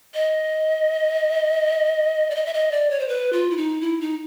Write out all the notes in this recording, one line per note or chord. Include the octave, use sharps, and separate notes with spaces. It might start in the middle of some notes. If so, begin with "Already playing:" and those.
D#5
D5
D#5
E5
D#5
D5
C#5
C5
B4
F4
E4
D#4
E4
D#4